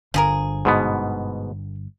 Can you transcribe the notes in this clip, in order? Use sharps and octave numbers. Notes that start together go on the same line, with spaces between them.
G1 D3 F3 G#4 A#4
G#2 B2 B3